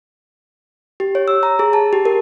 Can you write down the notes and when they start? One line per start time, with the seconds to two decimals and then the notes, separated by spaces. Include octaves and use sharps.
1.00 G4
1.15 C#5
1.28 E6
1.43 A#5
1.59 G#4
1.73 A5
1.93 G4
2.05 A#4